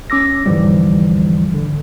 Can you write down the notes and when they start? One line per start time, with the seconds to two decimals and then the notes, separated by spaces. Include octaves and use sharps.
0.10 C#4 D6 E6 A#6
0.46 E2 G#2 D3 E3 F3 G3
1.54 D3